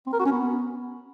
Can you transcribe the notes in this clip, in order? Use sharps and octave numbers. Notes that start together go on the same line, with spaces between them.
C4
A#4
F#4
C#4
B3